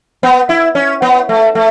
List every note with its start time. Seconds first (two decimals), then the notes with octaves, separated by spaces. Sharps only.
0.23 B3
0.49 E4
0.75 C#4
1.02 B3
1.29 A3
1.55 A3